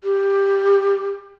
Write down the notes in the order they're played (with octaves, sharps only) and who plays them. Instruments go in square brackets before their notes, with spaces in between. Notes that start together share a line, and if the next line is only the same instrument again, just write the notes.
[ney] G4